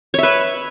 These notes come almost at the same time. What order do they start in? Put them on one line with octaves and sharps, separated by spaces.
C#5 E5 B4